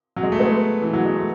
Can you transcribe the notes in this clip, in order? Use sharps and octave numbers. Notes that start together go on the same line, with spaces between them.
F#3
G#3
A3
G#3 B3
E3
F#3
G#3
A3